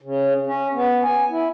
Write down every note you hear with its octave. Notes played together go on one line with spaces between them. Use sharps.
C#3
C#4
B3
G#5
E4